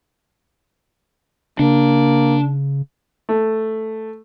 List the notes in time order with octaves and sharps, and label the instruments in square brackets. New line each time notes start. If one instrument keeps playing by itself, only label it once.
[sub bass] C#3 [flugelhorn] A#3 [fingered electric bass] D4
[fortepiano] A3